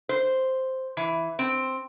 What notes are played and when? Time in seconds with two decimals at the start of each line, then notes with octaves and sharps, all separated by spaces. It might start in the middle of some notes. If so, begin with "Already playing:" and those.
0.09 C5
0.97 E3
1.39 C4